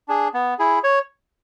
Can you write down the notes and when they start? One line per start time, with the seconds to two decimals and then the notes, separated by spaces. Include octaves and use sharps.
0.08 D4 G#4
0.34 B3
0.59 E4 G#4
0.84 C#5